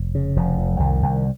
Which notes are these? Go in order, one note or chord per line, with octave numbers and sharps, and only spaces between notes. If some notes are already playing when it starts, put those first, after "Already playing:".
Already playing: F1
C#3
F1 F3
F2
C2 D#3
C2